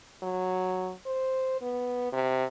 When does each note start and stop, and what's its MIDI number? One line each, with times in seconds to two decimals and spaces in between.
0.23 0.92 54
1.06 1.61 72
1.61 2.10 59
2.13 2.45 48